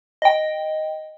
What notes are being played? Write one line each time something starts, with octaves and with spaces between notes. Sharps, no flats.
D#5 G5